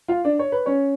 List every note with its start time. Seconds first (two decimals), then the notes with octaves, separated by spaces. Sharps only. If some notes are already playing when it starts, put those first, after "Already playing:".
0.08 F4 F5
0.24 D4 D5
0.39 C#5
0.52 B4
0.66 C#4 C#5